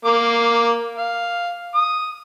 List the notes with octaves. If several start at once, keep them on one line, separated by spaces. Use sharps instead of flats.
A#3 D6
F5
D#6